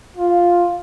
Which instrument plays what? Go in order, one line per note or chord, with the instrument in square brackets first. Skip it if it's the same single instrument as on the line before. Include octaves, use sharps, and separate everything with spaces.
[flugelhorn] F4